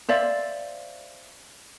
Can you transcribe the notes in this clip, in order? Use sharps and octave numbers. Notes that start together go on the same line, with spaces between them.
C5 D5 E5 F5